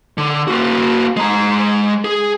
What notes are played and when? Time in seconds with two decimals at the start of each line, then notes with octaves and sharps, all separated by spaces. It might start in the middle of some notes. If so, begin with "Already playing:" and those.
0.18 D3
0.48 A#3 F#4
1.17 G#3 A#5
2.05 G#4